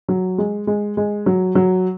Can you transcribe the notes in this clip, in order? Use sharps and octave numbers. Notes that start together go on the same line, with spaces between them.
F#3
G#3
G#3
G#3
F#3
F#3